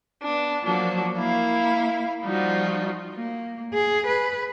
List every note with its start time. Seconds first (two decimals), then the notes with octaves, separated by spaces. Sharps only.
0.23 B3 D4
0.62 F3 F#3 A#3 D4 F#4
1.18 A#3 E4 F5
2.22 F3 G3 D#4 F4 F#4
3.15 A#3
3.74 G#4
4.07 B4